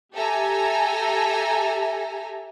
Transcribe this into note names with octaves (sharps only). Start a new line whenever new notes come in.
G4 A4 E5 G#5 A#5